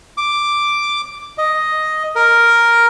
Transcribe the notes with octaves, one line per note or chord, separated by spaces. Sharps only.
D6
D#5
A#4